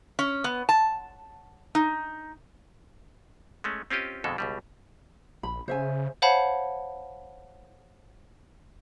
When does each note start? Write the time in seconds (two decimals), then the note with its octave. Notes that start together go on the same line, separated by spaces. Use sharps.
0.19 C#4
0.44 B3
0.69 A5
1.75 D#4
3.64 G#3 A3 C#4
3.90 C4 C#4 F4 G4 D#5
4.24 F2 B2 D3 G#3 A4
4.38 C#2 B2 G3
5.43 A#1 B5
5.68 C#3 C5 E5 G#5
6.22 C5 C#5 F5 F#5 A5 B5